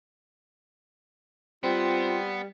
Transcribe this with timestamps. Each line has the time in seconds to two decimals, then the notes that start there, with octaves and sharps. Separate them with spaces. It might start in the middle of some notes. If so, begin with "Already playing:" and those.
1.63 G3 B3 C4 F4